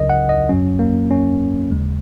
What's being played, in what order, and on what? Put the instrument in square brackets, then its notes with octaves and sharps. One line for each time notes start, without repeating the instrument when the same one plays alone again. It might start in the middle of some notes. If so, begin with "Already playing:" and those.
Already playing: [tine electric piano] C#2 C#3 F#3 A#4 D#5
F#5
D#5
F#2 F#3 C#4
A#3
C#4
D#2 C#3 G#3